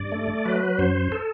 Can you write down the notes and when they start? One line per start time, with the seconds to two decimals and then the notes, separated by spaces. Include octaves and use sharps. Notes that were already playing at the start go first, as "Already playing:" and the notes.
Already playing: G2 D5
0.12 A3
0.45 F#3 B4
0.79 F#2 C5
1.12 A4